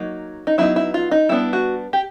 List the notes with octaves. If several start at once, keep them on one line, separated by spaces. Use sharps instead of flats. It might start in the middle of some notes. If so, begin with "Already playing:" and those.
Already playing: F#3 A#3 D#4
D#4
F#3 B3 D#4 E4
E4
F4
D#4
G3 B3 D4 E4
F#4
G4